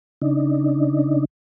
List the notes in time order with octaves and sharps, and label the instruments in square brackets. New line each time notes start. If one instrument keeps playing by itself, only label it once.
[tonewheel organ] C#3 D4 D#4